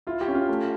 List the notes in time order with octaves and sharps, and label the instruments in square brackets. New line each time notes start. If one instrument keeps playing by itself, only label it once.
[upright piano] E4 [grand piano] F4
[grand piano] G4
[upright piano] C#4
[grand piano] F4
[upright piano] A3